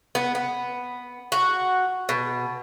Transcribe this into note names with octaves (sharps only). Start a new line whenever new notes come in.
B3
B3
F#4
B2